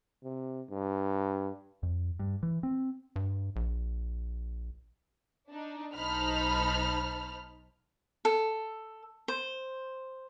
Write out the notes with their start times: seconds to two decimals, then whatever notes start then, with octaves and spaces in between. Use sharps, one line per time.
0.23 C3
0.70 G2
1.83 F2
2.19 G2
2.43 E3
2.63 C4
3.16 G2
3.56 A#1
5.50 D4 D#4
5.94 B1 D#4 C5 A5 B5 F6
8.25 A4
9.28 C5